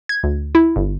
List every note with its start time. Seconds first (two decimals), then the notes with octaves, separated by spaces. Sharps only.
0.09 G#6
0.23 D2
0.55 E4
0.76 G1